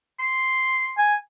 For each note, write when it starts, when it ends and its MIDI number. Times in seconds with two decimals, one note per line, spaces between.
0.20 0.93 84
0.98 1.16 80